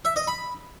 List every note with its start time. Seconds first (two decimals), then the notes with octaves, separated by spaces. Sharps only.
0.05 E5
0.16 D#5
0.27 B5